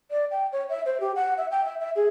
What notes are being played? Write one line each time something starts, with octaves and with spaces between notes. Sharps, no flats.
D5
G5
C#5
E5
C5
G4
F#5
E5
G5
E5
E5
G#4